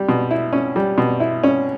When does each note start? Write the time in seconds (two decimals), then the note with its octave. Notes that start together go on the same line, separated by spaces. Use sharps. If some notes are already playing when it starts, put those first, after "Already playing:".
Already playing: G3
0.09 B2
0.31 E4
0.53 C#4
0.76 G3
0.98 B2
1.20 E4
1.44 C#4